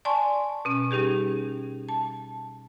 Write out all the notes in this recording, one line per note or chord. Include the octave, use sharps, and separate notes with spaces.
D5 G#5 A5 C6 C#6
B2 C#4
G3 C#4 D#4 G4 G#4
A5